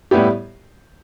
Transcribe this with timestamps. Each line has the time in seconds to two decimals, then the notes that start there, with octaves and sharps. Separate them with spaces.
0.11 A2 G3 B3 E4 G4